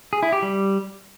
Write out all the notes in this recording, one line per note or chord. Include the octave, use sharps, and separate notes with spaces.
G#4
E4
G4
G3